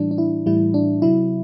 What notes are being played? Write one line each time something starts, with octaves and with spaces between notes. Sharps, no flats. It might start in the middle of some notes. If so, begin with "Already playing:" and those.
Already playing: A2 E3 G3 D4
D4
E4
A2 E3 G3 E4
D4
C3 F#3 E4